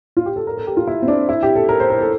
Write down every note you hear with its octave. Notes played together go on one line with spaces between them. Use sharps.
F4
G4
A4
A#4
A4
G4
F4
E4
C4
D4
E4
G4
A4
A#4
C5
A#4
A4